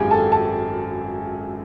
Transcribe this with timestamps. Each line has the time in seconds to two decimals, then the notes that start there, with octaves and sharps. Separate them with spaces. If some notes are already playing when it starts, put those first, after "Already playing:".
Already playing: G#1 F#2 G#3 G4 G#4 F5 G5 G#5
0.11 A4 A5
0.32 A4 A5